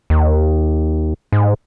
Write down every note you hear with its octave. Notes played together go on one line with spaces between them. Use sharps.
D#2
G#2